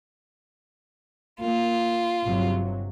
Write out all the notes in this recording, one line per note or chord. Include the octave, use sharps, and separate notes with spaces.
A#3 F4
G1 C3 F#3